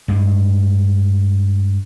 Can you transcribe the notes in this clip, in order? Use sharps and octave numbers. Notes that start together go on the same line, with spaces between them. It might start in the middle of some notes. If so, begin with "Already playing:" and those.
G2 G#3